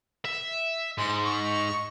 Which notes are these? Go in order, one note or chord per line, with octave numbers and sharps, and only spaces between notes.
E5
G#2 C6
C#6